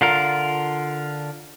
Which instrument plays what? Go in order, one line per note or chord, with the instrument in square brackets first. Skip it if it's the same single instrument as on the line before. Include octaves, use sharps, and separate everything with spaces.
[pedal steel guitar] D3 F4 A#4